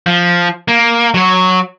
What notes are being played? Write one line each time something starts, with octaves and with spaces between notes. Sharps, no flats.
F3
A#3
F#3 C#5